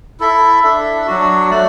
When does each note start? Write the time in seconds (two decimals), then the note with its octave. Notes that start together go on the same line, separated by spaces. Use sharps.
0.20 E4 A4 E5
0.63 D4 A4 E5
1.07 F#3 D4 F#4
1.50 A3 F#4 D5